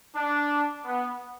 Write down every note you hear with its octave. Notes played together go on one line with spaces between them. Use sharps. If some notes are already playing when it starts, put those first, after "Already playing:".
D4
B3